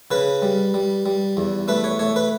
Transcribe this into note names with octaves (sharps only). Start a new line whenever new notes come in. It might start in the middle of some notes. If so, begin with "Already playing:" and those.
C#3 B4
G3
G3
G3
E2
A3 B4
C#5
A3 C#5
B4